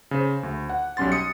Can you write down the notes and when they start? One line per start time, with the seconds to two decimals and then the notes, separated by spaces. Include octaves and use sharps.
0.11 C#3 C5
0.43 D2
0.70 F#5
0.97 B1 G3 C#4 C6 A6
1.12 D#6 C#7